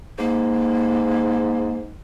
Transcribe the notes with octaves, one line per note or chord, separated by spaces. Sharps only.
G#2 A#3